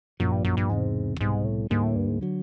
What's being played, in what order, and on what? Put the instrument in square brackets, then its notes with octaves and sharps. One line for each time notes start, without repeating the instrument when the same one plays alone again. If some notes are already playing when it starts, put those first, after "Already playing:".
[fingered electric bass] A#1 A#2 F3 [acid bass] F#2
[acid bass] G2
F#2
G2
[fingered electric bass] E1 E2 C3 [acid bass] G#2
[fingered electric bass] C2 B2 G3 [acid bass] G#2
[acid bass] A2
[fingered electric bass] D2 D3 G3 A#3 [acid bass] G#2
[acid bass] A2
G2
G#2
[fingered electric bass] D3 F#3